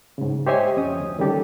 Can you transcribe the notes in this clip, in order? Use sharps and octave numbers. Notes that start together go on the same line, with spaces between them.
G#2 C#3
G4 C5 C#5 D#5 E5 G#5
F2 C#4 D#6
D2
D#3 G3 C#4 G4 A4